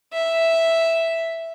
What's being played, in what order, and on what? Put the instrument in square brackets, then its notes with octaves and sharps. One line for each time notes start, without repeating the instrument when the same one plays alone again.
[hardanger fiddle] E5